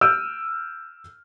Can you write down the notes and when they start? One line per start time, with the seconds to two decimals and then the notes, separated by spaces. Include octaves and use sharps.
0.01 E6 F6 G6 D7 D#7